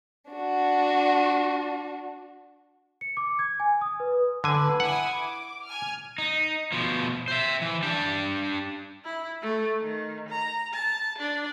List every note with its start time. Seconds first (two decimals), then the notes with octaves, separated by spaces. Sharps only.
0.32 D4 F#4
3.01 C#7
3.17 D6
3.39 G#6
3.60 G#5
3.81 D#6
4.00 B4
4.44 D3 B4 G#5
4.80 E4 F#5 G#5 D#6
5.13 D6
5.66 G#5 F6
6.18 D#4
6.72 B2 F3
7.28 C5 E5
7.62 E3
7.83 D4 G4
9.05 E4
9.42 A3
9.81 D#3
10.29 A#5
10.74 A5
11.18 D4